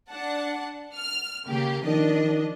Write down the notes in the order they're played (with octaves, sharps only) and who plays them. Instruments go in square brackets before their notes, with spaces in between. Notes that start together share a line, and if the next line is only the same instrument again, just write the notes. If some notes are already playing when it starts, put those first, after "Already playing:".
[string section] D4 F#5 A5
F6
C#3 A#3 G4
[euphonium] D#3 [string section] F3 D4 D#5